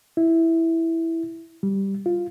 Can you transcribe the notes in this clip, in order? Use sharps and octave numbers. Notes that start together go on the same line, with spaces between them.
E4
G3
F4